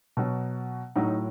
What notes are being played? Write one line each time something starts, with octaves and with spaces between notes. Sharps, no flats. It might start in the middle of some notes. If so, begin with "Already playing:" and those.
B2 F#3
A2 F#3 D#4